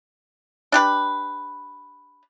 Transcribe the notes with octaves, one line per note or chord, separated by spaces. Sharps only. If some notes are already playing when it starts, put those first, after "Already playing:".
D4 G4 B4